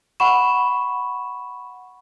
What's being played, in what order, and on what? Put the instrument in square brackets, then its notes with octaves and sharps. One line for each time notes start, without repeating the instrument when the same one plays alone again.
[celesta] F#5 B5 C#6 E7